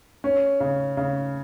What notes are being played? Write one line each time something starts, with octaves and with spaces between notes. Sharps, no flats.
C#4
C#3
C#3